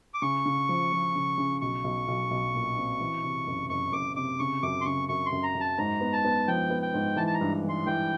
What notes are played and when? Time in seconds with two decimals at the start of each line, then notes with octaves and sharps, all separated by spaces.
0.14 D6
0.22 C#3 C#6
0.46 C#3
0.69 F3
0.93 F3
1.16 C#3
1.38 C#3
1.61 B1 C#6
1.84 B1
2.08 B1
2.31 B1
2.55 A#2
2.77 C4
3.00 E3
3.23 C3
3.47 F#1
3.70 F#1 C#6
3.92 F#1 D6
4.16 C3 D6
4.39 C#3 C#6
4.63 F#2 D6
4.81 C6
4.85 C#3 C#6
5.09 F#2 C#6
5.26 C6
5.32 F#2
5.43 A#5
5.55 F#2
5.60 A5
5.78 G#2 A#5
6.01 B3
6.13 A5
6.25 B3
6.48 F3 G5
6.70 B3
6.82 G5
6.94 G#2
7.17 E3 A5
7.27 A5
7.34 A#5
7.41 G2
7.64 E3
7.69 C6
7.86 E3 G5